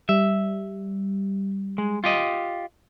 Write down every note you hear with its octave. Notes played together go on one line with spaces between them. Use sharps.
G3 E5
G#3
F4 G4 D#5